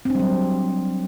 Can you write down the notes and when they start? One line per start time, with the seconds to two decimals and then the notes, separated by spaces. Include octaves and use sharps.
0.05 C4
0.10 D4
0.15 G3
0.20 F#3